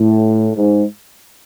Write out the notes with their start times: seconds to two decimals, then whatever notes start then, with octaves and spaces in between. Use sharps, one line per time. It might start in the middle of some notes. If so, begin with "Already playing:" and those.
Already playing: A2
0.56 G#2